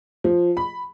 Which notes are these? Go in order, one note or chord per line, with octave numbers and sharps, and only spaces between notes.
F3
B5